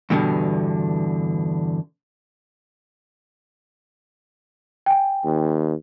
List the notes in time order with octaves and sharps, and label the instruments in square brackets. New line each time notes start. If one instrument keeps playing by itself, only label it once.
[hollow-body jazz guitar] E2 G2 B2 D3
[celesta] G5 G#5
[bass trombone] D#2